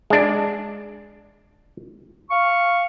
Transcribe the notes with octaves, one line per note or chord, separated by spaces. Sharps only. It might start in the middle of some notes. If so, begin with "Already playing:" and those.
G#3 D4
F5 C#6